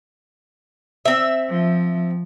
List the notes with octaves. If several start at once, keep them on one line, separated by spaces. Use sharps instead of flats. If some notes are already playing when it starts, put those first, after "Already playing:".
C4 E5
F3